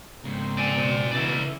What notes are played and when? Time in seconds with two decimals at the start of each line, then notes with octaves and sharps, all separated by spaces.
0.24 G#2 C#3 C4 D#4
0.58 B2 D5 G#5
1.12 C#3 E3 D#4 D5 E5